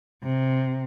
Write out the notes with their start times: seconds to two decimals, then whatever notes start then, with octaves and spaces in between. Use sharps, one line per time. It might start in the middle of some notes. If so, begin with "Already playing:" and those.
0.23 C3